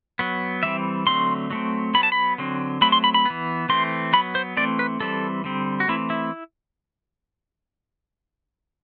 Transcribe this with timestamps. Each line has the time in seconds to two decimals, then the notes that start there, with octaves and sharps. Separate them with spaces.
0.19 F#3 B3
0.63 E3 G3 C4 E5
1.07 D3 F#3 A3 C4 C6
1.50 F#3 A3 C4
1.94 F#3 B3 B5
2.03 A5
2.12 B5
2.38 D3 F#3 C4
2.81 F#3 A3 C4 B5
2.92 C6
3.04 B5
3.14 B5
3.25 E3 B3
3.69 E3 A3 C4 C6
4.13 F#3 B3 B5
4.35 C5
4.57 E3 A3 C4 D5
4.79 B4
5.00 E3 G3 C4 A4
5.44 D3 G3 C4
5.80 F#4
5.88 E3 A3 C4 E4
6.10 E4